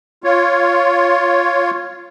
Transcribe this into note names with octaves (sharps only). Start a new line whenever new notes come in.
F4 C#5